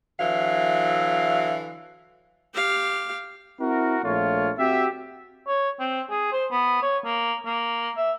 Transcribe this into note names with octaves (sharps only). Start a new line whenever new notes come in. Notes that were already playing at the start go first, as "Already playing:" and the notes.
D3 E3 F#3 E5 F5
G4 F5
C4 E4 F#4 A#4
A#1 A3 F4 C#5
C4 F#4 G4 E5
C#5
C4
G#4
C5
B3
C#5
A#3
A#3
E5